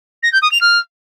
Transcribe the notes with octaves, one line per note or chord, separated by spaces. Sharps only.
A#6
G6
D#6
F7
F6